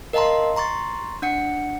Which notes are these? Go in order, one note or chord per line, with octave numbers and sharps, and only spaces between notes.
A#4 D#5 F5 A5 A#5 C6
A#5 C6 C#6 A6
D4 F#5 C#7